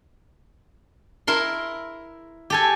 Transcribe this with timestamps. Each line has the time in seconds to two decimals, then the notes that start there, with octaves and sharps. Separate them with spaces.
1.27 E4 A#4 C6
2.50 G4 A4 G#5